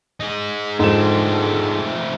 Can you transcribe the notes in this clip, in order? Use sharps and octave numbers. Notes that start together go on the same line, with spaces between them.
D#4 G#4
G#2 D3 F3 A3 C4 D#4 E7